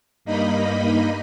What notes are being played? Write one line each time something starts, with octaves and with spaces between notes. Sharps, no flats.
G2 A#3 D#4 D#5 B5